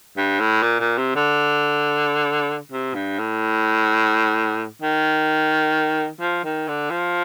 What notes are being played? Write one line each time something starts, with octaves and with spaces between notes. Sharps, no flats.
G2
A2
A#2
A#2
C3
D3
C3
G2
A2
D#3
F3
D#3
D3
F3